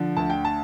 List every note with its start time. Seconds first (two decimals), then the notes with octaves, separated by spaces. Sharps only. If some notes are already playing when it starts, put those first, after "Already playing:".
Already playing: D3 F3
0.17 D2 A5
0.30 G5
0.45 A5